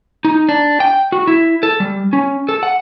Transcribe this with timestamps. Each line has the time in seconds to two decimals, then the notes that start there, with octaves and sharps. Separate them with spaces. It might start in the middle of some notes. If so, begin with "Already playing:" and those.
0.25 D#4
0.49 D4
0.80 G5
1.12 F#4
1.27 E4
1.63 A4
1.80 G3
2.13 C#4
2.49 A4
2.63 F#5